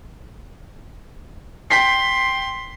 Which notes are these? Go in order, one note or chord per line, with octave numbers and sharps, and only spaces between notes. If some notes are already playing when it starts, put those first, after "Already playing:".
G5 C6 B6 C7